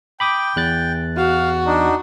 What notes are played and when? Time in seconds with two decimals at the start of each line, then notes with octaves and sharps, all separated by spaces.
0.20 G5 B5 D6 D#6
0.56 E2 F#6 A6
1.17 F#4 F5
1.66 D4 D#4